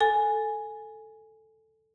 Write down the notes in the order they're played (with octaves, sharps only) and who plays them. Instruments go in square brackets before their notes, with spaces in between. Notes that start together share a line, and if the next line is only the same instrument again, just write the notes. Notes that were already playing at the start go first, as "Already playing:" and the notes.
[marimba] A4 G#5